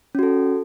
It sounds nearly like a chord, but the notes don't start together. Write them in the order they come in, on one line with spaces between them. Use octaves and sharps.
C#4 F#4 A4